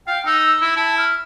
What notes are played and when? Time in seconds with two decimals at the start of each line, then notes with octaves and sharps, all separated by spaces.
0.07 F5 G5
0.26 D#4 E6
0.62 E4
0.76 E4 A5
0.98 F6